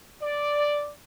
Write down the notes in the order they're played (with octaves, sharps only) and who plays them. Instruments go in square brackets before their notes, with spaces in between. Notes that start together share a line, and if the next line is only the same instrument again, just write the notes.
[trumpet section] D5